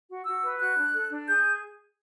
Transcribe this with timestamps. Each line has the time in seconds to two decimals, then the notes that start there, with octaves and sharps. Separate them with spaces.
0.08 F#4
0.25 F#4 E6
0.42 B4
0.60 F#4 F#6
0.77 D4
0.93 A4
1.10 D4
1.27 G#4 G6